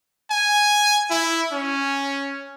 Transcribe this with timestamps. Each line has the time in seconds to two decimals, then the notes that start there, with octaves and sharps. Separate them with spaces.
0.30 G#5
1.10 E4
1.52 C#4